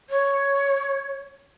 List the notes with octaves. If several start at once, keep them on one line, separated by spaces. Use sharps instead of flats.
C#5